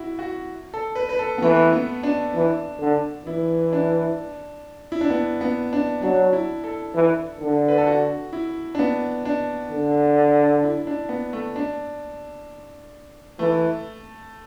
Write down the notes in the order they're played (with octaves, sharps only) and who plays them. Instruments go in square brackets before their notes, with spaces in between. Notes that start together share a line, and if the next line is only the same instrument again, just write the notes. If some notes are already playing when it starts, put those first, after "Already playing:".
Already playing: [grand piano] E4 F#4
F#4
A4
B4
B4
A4
B3
[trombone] E3 [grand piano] A3
[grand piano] B3
D4
[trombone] E3
D3
[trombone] E3 [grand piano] E4
[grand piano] D4
E4
D4
B3
B3
D4
[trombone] F#3 [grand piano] D4
[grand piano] E4
A4
[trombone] E3
D3
[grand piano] B4
A4
F#4
E4
D4
B3
D4
[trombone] D3
[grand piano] E4
D4
B3
A3
D4
[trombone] E3 [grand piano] A3